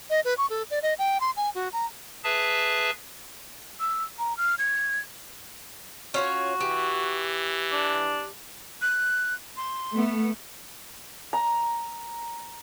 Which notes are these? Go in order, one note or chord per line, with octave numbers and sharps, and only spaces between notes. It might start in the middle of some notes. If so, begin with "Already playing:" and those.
D#5
B4
C#6
A4
D5
D#5
G5
C6
G#5
F#4
A#5
G#4 B4 E5 A5
E6
A#5
F6
G#6
C#4 F4 F#4 C#5
E3 G4
D4
F#6
C6
A3 B3
A#5